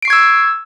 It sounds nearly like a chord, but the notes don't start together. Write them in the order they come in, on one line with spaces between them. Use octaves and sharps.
D7 C7 C#6 G#6 E6